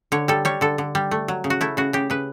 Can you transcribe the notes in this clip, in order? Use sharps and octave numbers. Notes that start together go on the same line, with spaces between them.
D3 C#5
G3 A4
G3 C#5
D3 A4
D3
G3
A3
F#3
C#3
F#4
A3 E4
C#3 F#4
C#3 G4
C#3 B4